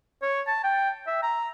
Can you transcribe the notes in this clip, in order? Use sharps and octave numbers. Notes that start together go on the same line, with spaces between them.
C#5
A5
G5
E5
A#5